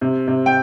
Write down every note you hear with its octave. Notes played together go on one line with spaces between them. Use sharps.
C3
C3
G5